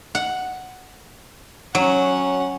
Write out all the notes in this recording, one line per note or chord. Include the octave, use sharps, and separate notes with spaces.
F#5
F#3 C#4 F#5